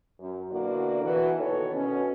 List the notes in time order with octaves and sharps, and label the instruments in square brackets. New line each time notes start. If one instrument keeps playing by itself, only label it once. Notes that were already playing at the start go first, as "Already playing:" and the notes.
[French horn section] F#2
B2 D3 A#3 E4 F#4 D5
B2 E3 F#4
B2 D#3 F#4 A4 B4 C#5
B2 C#4